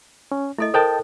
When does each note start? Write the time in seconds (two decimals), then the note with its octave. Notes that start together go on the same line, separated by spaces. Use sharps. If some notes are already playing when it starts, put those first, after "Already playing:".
0.32 C#4
0.58 A3 E4 A4 D#5
0.74 A4 A#4 C5 D#5 G5 A5